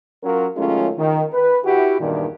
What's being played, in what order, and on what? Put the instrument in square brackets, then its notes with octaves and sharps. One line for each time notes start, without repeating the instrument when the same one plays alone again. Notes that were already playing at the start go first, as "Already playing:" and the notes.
[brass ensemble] F#3 C#4 F4 A#4
D#3 F#3 G#3 A3 C#4 F4
D#3
B4
E4 F#4 G4
E2 G2 A#2 D#3